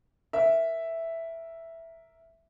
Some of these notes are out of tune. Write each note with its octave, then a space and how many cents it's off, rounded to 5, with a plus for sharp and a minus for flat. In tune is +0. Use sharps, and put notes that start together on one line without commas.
A#4 +0 E5 +0